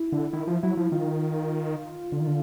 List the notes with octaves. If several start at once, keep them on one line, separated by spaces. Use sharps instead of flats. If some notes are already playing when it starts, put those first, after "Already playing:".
Already playing: E4
D3
D#3 E4
F3
F#3 E4
F3
D#3 F4
D3
D#3
D3